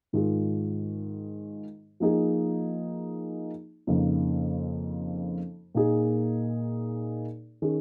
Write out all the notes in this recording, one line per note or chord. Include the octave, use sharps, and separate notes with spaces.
G#2 D#3 G#3 F4 G#4
F3 A#3 D#4 G#4
F2 C#3 A#3 D#4
A#2 A#3 D#4 G#4
D#3 C#4 G#4